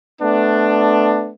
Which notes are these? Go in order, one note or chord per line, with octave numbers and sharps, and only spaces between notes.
A3 B3 D4